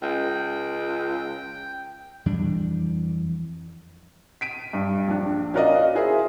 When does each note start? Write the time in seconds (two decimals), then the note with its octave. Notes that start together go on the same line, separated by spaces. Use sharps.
0.02 C#2 G5
2.26 F2 E3 G3 D4
4.41 B6 D7 D#7
4.73 G2
5.08 A#1 D4
5.54 C#4 F#4 A#4 D5 D#5 F5
5.94 E4 F4 G#4 A#4 C5 E5